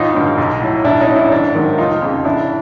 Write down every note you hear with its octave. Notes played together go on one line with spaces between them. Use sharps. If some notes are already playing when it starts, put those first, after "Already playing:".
Already playing: A1 D#4 F4
G2 D3
B1
A2 F#3
B1 D4 E4
C#4 D#4
A2 F#3
D4 E4
G#1 D4
G#2 D#3 F#3
F1 D#4 F4
F2 C#3
A1 D4 E4